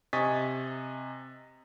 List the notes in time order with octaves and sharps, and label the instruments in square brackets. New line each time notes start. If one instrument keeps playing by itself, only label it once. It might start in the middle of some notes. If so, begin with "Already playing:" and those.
[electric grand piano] C3 D#5 G#5 C#6 A6 B6